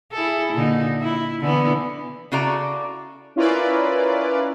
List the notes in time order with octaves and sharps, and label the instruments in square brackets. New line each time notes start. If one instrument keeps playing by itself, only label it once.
[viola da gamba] E4 G#4 A4
A#2 D3 D#4
E4
D3 E3 B3
[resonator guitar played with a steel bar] C#3 E4 F#4 A4 D5 A#5
[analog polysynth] C#4 E4 F4 A#4 B4 D5